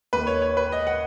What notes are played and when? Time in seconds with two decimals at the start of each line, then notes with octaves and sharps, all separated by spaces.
0.13 D#2 D#3 B4
0.27 C#5
0.42 C#5
0.57 B4
0.72 D#5
0.87 F#5